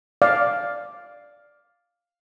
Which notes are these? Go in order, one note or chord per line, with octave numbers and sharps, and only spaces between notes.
D5 F5